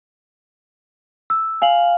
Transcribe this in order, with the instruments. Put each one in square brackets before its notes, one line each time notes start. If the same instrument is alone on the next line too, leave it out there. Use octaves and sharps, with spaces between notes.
[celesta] E6
[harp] F5 [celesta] G#5 F#7